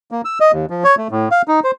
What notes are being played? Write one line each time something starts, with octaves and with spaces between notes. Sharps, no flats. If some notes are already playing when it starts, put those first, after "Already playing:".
A#3
E6
D#5
D#2
F3
C#5
A3
A2
F5
D#4
C5